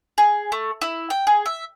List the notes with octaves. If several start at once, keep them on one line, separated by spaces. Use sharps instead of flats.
G#4
A3
E4
G5
G#4
E5